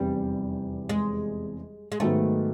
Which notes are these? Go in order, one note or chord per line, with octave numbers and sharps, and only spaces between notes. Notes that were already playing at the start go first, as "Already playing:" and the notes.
Already playing: F1 E2 C3 E3 G3
G#3
G#3
G#2 D#3 F#3 A3 B3